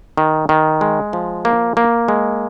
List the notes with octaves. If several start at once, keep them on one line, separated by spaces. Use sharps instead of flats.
D#3
D#3
G#3
F3
A#3
A#3
G#3